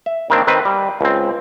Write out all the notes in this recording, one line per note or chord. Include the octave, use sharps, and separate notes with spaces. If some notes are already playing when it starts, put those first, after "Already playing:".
E5
D#3 A#3 C4 D4
D#3 C4 B4
G3
C#2 C4